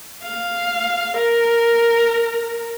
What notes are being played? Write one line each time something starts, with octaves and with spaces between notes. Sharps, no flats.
F5
A#4